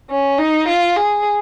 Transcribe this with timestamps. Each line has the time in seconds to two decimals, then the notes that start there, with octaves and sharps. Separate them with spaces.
0.10 C#4
0.38 D#4
0.68 F4
0.97 G#4